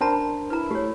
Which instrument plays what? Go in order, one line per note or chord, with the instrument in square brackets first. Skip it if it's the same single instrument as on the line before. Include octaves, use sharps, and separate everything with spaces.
[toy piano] C#4 A5 B5 [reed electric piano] D4 A#4 C5
[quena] E4 [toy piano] B4 A#5
[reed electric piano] A3 [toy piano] G4 C#5